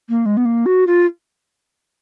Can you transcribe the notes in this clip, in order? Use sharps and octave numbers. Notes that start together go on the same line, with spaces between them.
A#3
G#3
B3
A#3
F#4
F4